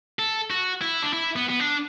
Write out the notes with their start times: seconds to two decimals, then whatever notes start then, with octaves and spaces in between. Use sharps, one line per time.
0.19 A4
0.50 F#4
0.82 E4
1.02 D4
1.13 E4
1.36 B3
1.49 B3
1.60 D4